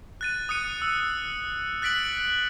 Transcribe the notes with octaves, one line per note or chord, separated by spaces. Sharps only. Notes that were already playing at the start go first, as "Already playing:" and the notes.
F#6 A6 D#7
D#6 F#6 C#7 D#7
E6
F#6 A6 B6 D7 F#7